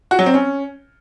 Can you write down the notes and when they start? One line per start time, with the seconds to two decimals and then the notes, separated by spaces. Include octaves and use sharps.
0.11 F#4
0.19 F#3
0.26 C4
0.34 C#4